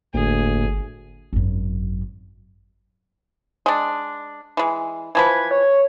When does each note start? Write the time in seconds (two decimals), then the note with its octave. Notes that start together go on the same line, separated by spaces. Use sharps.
0.14 G1 D2 A2 A#3 G#4
1.33 G#1 F#2
3.66 G#3 D4
4.57 E3 G#3
5.15 E3 F3 B4 G#6
5.51 C#5